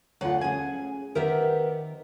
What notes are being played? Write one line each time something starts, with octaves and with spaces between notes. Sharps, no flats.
D2 F#3 F4 F#5
C#4 G#4 G#5
D#3 B3 G4 A#4 C5 E5